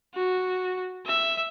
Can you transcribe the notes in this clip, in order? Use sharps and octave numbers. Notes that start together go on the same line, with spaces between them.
F#4
E5